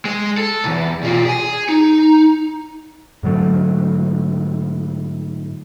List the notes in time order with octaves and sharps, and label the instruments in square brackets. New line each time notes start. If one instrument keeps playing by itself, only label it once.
[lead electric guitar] G#3
A4
B1 E2
B2 F4
G#4 G#5
D#4
[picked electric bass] G#2 D3 F#3 A3